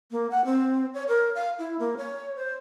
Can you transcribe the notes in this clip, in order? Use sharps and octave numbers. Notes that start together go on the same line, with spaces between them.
A#3
F#5
C4
C#5
A#4
F5
E4
A#3
C#5
C5